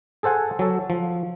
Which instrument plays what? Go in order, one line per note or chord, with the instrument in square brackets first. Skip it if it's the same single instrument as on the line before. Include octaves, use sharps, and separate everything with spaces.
[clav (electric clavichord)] G#4 A4 C5 F#5 G#5
F#3 A4
F3